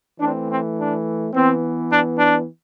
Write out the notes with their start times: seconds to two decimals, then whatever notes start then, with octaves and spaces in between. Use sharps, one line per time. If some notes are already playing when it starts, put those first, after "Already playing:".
0.20 E3 A3 C4 D4
0.49 C4
0.78 D4
1.33 E3 B3 C4
1.90 D4
2.18 D4